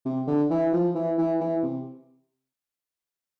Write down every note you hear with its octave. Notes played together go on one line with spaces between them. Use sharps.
C3
D3
E3
F3
E3
E3
E3
C3